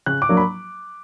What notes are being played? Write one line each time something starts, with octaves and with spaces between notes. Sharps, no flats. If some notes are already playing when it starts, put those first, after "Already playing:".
C#3 F#6
D6
F#3 A#3 D4
B5